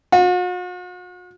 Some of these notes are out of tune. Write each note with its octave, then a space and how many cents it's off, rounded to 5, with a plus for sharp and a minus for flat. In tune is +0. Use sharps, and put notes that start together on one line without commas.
F#4 -45